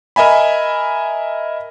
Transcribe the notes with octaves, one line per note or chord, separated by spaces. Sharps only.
A#4 D#5 E5 G#5 B5